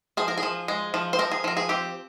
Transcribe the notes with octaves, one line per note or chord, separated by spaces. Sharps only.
F3 G#4
A#4
G#4
F3
G#3
F3
C5
F3 A#4
G#4
F3 A#4
G#4
C4 G4